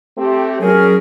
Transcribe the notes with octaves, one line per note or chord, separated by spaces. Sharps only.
A3 C4 G4
F#3 C#4 G#4 A#4